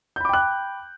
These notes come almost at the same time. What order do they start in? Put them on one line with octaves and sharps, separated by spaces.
G6 B5 D6 G5 F#6